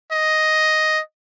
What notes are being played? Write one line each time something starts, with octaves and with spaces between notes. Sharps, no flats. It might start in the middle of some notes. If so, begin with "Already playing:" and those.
D#5